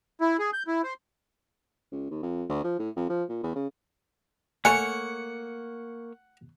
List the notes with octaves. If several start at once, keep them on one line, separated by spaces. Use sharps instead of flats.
E4
G#4
G6
E4
C5
C#2
D#2
F2
D2
F3
A2
F2
F3
A#2
E2
C#3
A3 A#3 C#5 F#5 G#5